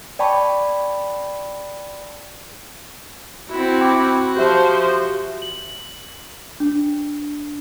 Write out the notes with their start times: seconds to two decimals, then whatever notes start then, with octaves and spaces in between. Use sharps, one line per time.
0.19 D5 G5 A5 B5 C#6
3.50 C4 E4 F#4
3.81 G5 B5 D6
4.37 F3 G4 C5 E5
5.42 F#7
6.60 D4